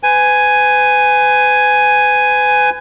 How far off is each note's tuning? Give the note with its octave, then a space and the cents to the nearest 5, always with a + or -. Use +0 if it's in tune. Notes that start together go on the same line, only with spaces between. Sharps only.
B4 +35 G#5 +0